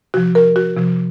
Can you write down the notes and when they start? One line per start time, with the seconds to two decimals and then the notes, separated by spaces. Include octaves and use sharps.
0.14 C3 F3 F#4
0.35 A#4
0.56 F#4
0.77 C3 F3